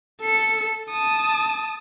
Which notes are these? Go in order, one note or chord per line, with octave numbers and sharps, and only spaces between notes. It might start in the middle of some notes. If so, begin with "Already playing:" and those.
A4 C#7
A5 D#6